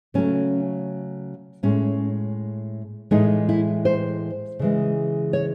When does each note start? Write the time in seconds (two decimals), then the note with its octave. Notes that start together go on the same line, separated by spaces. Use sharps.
0.14 C#3 F#3 A3 C#4
1.63 A2 G#3 C#4
3.11 A2 E3 G#3 D#4
3.49 E4
3.85 C5
4.59 C#3 E3 G#3
5.33 C#5